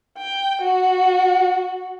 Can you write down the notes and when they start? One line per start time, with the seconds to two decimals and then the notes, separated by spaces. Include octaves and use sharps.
0.17 G5
0.62 F#4